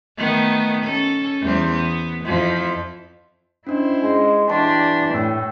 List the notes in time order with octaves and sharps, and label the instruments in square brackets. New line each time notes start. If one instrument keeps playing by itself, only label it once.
[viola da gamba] D#3 A3 B3
C#4 A4
E2 G3 C5
B3
F2 F3 E4
[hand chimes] C#4 D4 D#5 [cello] E4 C5
[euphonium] G#3
[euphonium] E3 [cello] D4 G4 [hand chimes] A5 C6 C#6
[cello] A2 [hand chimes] C#5 G5 E6